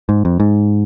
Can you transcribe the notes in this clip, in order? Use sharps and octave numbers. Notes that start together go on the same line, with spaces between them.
G#2
F2
G#2